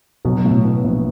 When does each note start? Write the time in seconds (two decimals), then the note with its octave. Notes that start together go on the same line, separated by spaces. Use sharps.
0.25 B2 F#3
0.38 B2
0.45 A2
0.51 B2
0.63 B2 B3
0.84 A#1